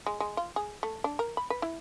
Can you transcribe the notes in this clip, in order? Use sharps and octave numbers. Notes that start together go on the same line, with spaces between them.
G#3
G#3
F4
G#4
A3
D4
A#4
B5
B4
E4